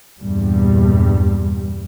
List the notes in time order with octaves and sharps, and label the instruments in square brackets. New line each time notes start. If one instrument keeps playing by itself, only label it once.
[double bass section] E2 G2 A#2 G3